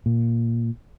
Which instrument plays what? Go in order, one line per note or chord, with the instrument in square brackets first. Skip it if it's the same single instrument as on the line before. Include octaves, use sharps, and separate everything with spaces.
[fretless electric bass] A#2